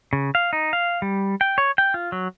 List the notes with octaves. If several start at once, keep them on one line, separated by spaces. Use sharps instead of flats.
C#3
F5
D#4
F5
G3
G5
C#5
G5
F4
F#3